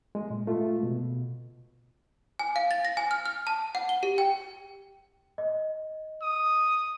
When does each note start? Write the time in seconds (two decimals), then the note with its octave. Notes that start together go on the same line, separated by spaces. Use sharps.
0.15 G#3
0.30 A#2
0.47 G#3 A3 F4
0.83 B2
2.39 G#5
2.56 F5
2.71 A6
2.85 A#6
2.97 G#5
3.11 F6
3.26 F6
3.47 A5
3.75 F#5
3.89 G7
4.03 G4
4.18 G5
5.38 D#5
6.22 D#6